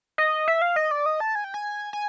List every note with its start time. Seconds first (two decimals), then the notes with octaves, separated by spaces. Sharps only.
0.18 D#5
0.48 E5
0.62 F5
0.76 D#5
0.91 D5
1.06 D#5
1.20 A5
1.35 G#5
1.44 G5
1.54 G#5
1.93 G#5